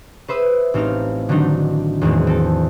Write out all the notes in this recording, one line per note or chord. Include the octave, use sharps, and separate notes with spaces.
B4 C5 E5 D#6
A1 C4 D#4 F5 F6
D3 D#3 F#3 C4 D4 D#4
E2 A2 D#3 G#3 A#3 C4
C4 A4